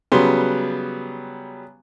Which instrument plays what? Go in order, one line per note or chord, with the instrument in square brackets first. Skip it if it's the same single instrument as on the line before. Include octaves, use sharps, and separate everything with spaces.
[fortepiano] C#3 F#3 G3 B3 C6